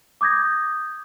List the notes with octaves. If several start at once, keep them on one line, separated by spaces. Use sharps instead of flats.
D6 D#6 G6 G#6 A#6